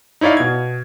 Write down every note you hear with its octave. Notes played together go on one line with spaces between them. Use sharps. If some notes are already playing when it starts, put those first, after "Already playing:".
D#4 E4 C#5 D5 F5
B2 G#6